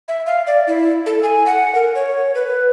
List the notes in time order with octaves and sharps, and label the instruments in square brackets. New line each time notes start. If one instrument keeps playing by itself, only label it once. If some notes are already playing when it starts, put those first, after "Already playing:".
[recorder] E5
F5
D5
E4
A4
G#5
F#5
A#4
C#5
B4